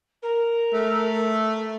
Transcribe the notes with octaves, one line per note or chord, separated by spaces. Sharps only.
A#4
A3